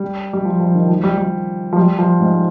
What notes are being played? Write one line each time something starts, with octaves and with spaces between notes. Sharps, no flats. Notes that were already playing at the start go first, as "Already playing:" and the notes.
Already playing: G3
G3
F3
F3
D#3
F3
G3
G3
F3
G3
F3
G#2